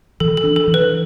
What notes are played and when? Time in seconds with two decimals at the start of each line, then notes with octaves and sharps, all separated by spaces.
0.20 E3 A4
0.37 A4
0.44 D4
0.56 A4
0.68 E3
0.74 B4